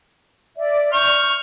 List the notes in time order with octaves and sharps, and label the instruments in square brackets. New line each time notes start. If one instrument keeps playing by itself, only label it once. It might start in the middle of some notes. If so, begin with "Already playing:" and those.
[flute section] D5 E5
[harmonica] C#6 F6 [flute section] G6